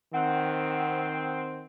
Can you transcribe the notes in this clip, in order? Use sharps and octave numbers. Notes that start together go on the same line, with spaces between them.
D#3 C4 F#5